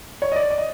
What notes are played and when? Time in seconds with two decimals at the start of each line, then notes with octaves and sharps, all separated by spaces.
0.22 C#5
0.32 D#5
0.36 D5
0.50 D5
0.58 D#5